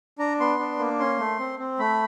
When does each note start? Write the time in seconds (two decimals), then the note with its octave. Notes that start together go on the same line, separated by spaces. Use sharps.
0.19 D4 A#5
0.40 B3 C6
0.59 D4
0.79 A#3
0.99 C#4 C6
1.19 A3
1.39 C4
1.59 C4
1.79 A3 B5